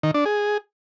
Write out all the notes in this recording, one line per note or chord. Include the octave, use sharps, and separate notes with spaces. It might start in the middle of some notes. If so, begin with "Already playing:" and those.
D#3
D4
G#4